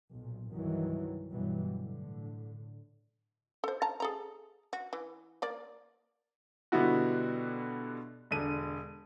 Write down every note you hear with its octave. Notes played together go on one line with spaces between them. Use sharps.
B1 A#2
C2 G2 D#3 E3 F#3
G2 B2 E3 F#3 G3
A2 D3
A4 C5
A5 A#5
G#4 A4 A#5
F#4
E3
A#3 D5
B2 D3 G3 B3 E4 F#4
E1 D3 D#7